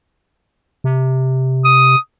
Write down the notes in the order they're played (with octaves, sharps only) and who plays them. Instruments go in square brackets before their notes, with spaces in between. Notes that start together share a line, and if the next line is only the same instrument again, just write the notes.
[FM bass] C3
[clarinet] D#6